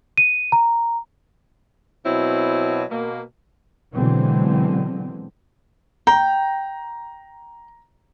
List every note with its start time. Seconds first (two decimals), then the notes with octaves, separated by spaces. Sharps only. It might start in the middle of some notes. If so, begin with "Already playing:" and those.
0.18 D#7
0.52 A#5
2.05 B2 F#3 C4 E4
2.91 B2 A#3
3.94 B2 D3 E3 F#3 G#3 C4
6.07 G5 A#5